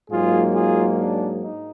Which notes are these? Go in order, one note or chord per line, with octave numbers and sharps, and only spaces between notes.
G#2 F#3 A#3 F4 G#4
F4 G#4
D4
D#4